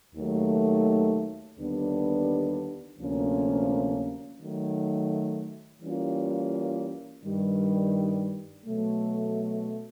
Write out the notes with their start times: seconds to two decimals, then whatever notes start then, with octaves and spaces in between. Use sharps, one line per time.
0.15 D#2 D#3 F#3 A3
1.57 D#2 D3 G3 B3 D4
2.99 D2 C3 F3 A#3 C#4
4.40 D#3 F#3 A3
5.82 E3 G3 A#3 C#4 F4
7.24 G2 D#3 G3
8.65 B2 F#3 A3